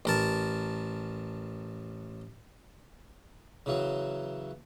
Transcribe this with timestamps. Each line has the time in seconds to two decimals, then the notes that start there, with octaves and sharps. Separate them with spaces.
0.05 A1 A#4 A5
3.66 C#3 E3 F#3